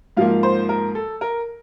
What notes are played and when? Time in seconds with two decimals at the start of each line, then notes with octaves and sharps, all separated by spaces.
0.17 G#2 F3 A#3 F5
0.43 C5
0.69 A#4
0.95 A4
1.21 A#4